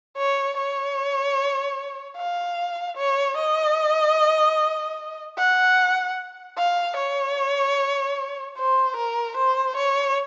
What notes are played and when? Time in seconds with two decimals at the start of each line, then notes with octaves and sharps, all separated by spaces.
0.17 C#5
0.57 C#5
2.17 F5
2.97 C#5
3.37 D#5
5.38 F#5
6.58 F5
6.97 C#5
8.57 C5
8.96 A#4
9.37 C5
9.77 C#5